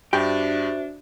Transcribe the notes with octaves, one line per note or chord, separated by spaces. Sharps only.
G2 D4 F#4 G4 C5 E5 G5